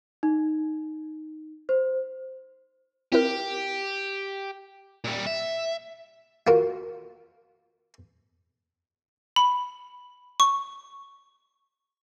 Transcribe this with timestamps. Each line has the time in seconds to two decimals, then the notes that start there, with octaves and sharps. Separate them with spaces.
0.23 D#4
1.69 C5
3.12 C4 E4 G4 A#4
5.04 A#2 G3
5.26 E5
6.47 F4 F#4 A#4
9.36 B5
10.40 C#6